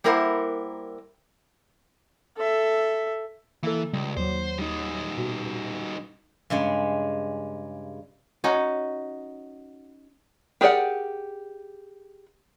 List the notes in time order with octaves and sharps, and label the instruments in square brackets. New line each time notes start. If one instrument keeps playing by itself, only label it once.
[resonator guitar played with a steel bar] G3 A#3 E4 A#4 C5 F#5
[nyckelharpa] A4 E5
[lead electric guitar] E3 [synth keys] A#3 A4
[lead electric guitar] C#2 [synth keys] G3
[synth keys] D#2 F#3 [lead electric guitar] C5
[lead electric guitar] G3 D#4
[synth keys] B2
[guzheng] G2 C#3 G#3 C#5
[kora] C#4 D#4 F#4
[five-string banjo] G4 G#4 A#4 D5 F#5